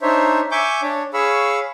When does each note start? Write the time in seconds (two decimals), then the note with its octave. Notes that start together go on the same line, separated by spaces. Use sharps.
0.02 D4 D#4 C5 C#5 E5
0.51 E5 G#5 C#6 D6 G6
0.83 D4 C#5
1.14 G#4 C#5 F5 B5 C#6 E6